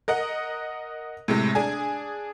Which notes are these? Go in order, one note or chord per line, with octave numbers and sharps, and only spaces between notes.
A#4 D#5 F#5
A2 C3 G#3
D4 G#4 G#5